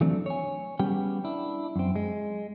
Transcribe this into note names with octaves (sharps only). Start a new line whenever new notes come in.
E3 F#3 A3 C4 D4
C#5 G#5
G3 B3 C#4 G4 G#4 G5
D4 E4
F#2 C4
G#3